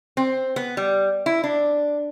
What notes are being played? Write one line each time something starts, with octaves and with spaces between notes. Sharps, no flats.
C4
B3
G3
E4
D4